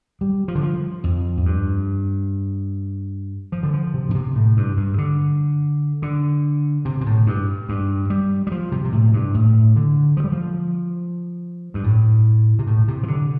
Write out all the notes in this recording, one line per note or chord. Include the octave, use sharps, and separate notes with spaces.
G3
F3
D3
F3
F2
F2
G2
F3
D3
F3
C3
A2
C3
A2
G2
G2
D3
D3
C3
C3
A2
G2
G2
G3
G3
F3
C3
C3
A2
G2
A2
D3
F3
G3
F3
G2
A2
C3
A2
C3
F3
D3